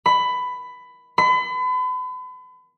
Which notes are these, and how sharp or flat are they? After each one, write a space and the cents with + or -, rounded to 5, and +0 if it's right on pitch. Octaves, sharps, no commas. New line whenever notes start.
B5 +15
B5 +40